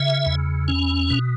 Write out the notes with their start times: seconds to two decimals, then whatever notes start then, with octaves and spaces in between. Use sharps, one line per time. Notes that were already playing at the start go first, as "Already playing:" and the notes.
Already playing: C#3 E5
0.26 E2
0.68 C#4
1.10 B2